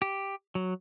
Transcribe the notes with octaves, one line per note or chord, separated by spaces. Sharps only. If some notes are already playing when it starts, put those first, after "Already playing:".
G4
F#3